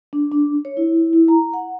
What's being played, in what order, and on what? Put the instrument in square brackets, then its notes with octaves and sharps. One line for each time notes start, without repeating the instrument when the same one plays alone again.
[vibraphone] D4
D4
C#5
E4
E4
A#5
F#5